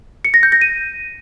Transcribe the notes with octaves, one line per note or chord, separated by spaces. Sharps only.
C#7
A#6
G6
A#6
D#7